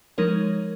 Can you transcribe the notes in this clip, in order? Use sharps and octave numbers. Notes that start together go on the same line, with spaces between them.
F3 G#3 D#4 A#4 C#5